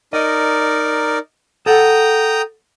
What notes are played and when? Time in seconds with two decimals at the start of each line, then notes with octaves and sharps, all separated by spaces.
0.13 D#4 A#4 D5 D#5
1.66 A4 F#5 G5 A#5 D#6